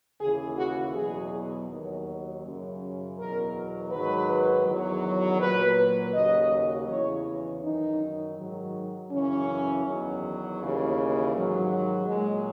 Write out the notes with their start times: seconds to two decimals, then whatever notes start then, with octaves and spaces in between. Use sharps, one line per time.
0.20 D#2 C#3 E3 G#4
0.57 F#4
0.95 E2 B2 F#3 G#4
1.69 D#2 D#3 F#3
2.43 F#2 C#3 F#3
3.17 E2 B2 F#3 A#4
3.92 G#2 D#3 F#3 B4
4.66 E2 D#3 F#3
5.40 A#2 F#3 B4
6.14 D#2 C#3 F#3 D#5
6.88 E2 C#3 E3 C#5
7.62 F#2 D#3 F#3 D#4
8.37 G#2 D#3 F#3
9.11 F#2 C#3 E3 C#4
9.85 E2 D#3 F#3
10.59 D#2 C#3 E3
11.33 G#2 D#3 F#3
12.08 A#2 F#3 G#3